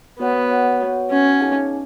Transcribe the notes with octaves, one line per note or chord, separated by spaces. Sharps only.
B3 F#4 C#5 F#5
F#4 C#5 F#5
F#4 C#5 F#5
C#4 F#4 C#5 F#5
D#4 G#4 C#5 F5 G#5